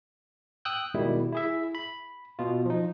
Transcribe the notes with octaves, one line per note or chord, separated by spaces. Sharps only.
G5 D#6 E6 F#6 G6
B2 D#3 G3 G#3 E4
E4 G#4 E5
B5
B2 F4
F3 D#4